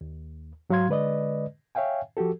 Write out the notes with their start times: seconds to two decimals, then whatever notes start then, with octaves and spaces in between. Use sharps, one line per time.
0.01 D#2
0.70 G#2 F#3 F#4 F5 C6 G#6
0.89 D3 G#3 B4 D5 D#5
1.75 C#5 E5 F5 G5 G#5
2.17 F3 F#4 G4 A4